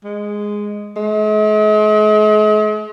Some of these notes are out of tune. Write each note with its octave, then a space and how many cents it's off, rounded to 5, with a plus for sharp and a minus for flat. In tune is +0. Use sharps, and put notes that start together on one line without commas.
G#3 -5
G#3 +45